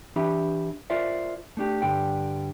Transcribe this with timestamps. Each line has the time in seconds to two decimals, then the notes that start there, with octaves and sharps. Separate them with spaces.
0.16 E3 D4 G4 E5 B5
0.90 F4 A#4 C5 D5 E5
1.57 A3 D4 G4
1.82 G2 D3 G3 G5